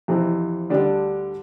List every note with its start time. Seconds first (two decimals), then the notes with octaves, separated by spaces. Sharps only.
0.08 F2 C3 E3
0.69 D2 D3 G3 D4 G4